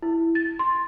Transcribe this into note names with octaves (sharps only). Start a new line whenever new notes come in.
E4
A6
C6